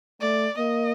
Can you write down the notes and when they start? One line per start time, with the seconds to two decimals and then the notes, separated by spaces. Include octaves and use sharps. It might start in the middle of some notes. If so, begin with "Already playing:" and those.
0.21 A3 D5
0.58 A#3 D#5